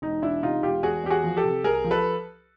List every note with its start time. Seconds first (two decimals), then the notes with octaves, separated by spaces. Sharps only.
0.02 E1 D#4
0.22 E1 D4 E4
0.42 C3 D#4 F4
0.63 E1 F4 G4
0.83 E2 F#4 G#4
1.03 E2 G4
1.10 F#4 G#4
1.24 F3
1.37 G4 A4
1.44 C3
1.64 C2 G#4 A#4
1.84 F3
1.91 A4 B4